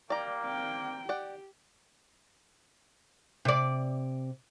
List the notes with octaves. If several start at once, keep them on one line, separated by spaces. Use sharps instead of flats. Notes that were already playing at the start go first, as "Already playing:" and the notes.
G3 A#3 D5 G5 A#5
C4 G5
G4 D5 F#5 G5
C3 D5